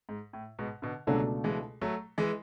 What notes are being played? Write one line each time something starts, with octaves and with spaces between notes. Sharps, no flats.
G#2
A2
G#2 B2
B2 D3
C#2 B2 D3 F#3 A3 D4 A4
E3 G#3
F#3 A3
E3 G#3